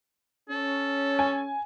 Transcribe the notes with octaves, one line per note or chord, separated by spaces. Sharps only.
C#4 A4
G#5